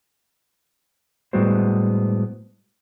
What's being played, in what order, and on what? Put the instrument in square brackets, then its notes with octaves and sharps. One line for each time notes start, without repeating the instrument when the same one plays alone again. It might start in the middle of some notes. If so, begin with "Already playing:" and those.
[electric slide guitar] A2 G3 G#3 B3 F#4 C5